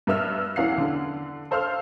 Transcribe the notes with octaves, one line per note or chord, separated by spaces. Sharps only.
G2 B3 E5 E6 F6
E2 E3 C#4 F5 F#5 C7
D3
A4 C5 F5 E6 F6